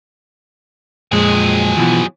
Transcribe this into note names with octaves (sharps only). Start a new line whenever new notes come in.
F2 A#2 F#3 G#3 G#4
B2 E3 F3